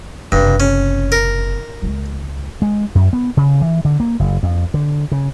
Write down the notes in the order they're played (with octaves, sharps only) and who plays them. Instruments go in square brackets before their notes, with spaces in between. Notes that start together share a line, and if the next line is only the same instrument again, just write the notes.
[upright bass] F#1 C3 [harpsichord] G2
[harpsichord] C#4
A#4
[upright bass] C#2 G#3
[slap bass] G#3
F#2
B3
C#3
E3
D3
A#3
F#1
F2
D3
C#3